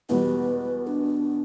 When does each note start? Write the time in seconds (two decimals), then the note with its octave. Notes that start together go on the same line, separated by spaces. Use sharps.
0.09 E2 B2 G3 B4
0.87 D4